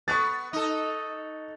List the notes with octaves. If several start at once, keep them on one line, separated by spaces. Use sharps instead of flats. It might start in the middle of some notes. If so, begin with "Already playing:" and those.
B3 C#6 F#6 A6
D#4 A4 D#5